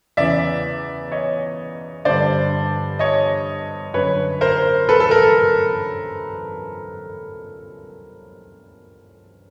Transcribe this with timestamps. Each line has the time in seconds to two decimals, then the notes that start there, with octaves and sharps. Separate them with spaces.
0.17 E2 C#3 E3 D5 E5
1.12 C#5 D#5
2.05 G2 D3 C5 D5
2.99 C#5 D#5
3.93 F#2 D3 B4 C#5
4.41 A#4 C5
4.89 A4 B4
5.00 A4
5.11 A#4
5.23 A4